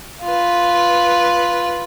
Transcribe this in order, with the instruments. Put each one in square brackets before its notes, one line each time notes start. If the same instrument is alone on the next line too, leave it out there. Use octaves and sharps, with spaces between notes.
[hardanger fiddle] F4 B4